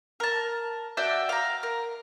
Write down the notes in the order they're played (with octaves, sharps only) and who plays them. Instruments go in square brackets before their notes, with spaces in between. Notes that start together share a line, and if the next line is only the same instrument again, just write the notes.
[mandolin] A#4 A5
F#4 D5 E5 G5
F5 A#5
A#4